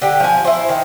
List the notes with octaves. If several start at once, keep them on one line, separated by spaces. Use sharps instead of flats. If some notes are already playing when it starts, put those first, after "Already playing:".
D3 G4
F3 G#5
E4 C5
D#3